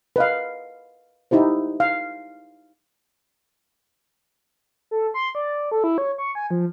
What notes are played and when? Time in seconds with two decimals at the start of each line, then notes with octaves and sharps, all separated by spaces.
0.16 B4 D#5 F5
1.31 D#4 E4 G4 C5
1.80 F5
4.91 A4
5.14 C6
5.35 D5
5.72 A4
5.84 E4
5.98 C#5
6.18 C#6
6.35 G#5
6.50 F3